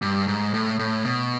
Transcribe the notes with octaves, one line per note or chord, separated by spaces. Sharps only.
G2
G#2
A2
A2
B2